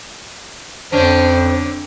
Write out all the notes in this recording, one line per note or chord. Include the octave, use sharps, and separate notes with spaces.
F2 D3 C#4 D4 C5